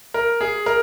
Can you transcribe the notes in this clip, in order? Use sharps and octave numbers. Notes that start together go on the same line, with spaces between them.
A#4
G#4
A#4